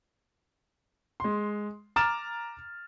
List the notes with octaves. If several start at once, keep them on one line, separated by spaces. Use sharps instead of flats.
G#3 C6
A#5 D6 F6 A6 E7